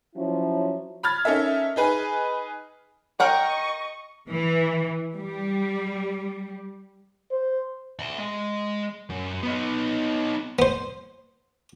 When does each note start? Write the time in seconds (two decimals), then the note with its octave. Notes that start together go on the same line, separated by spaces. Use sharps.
0.16 F3 F#3 C#4 E4
1.03 B5 F6 G#6 A6
1.25 C#4 D#4 A4 A#4 E5
1.76 D#4 G#4 B4 G#5
3.20 A#4 D#5 F#5 G5 C#6
4.29 E3
5.14 G3
7.31 C5
7.99 D5 E5
8.19 G#3
9.10 F#2
9.43 B3 D#4
10.59 B3 C5